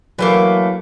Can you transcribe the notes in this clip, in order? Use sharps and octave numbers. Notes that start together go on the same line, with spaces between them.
E3 F#3 A3 A#3